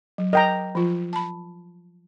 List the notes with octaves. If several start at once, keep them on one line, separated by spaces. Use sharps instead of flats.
F#3
A#4 D#5 G5 A#5
F3 F4
A5 B5